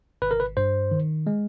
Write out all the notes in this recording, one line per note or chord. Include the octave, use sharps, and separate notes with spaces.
G#1 B4
A#4
B4
G2 C5
D#3
G#3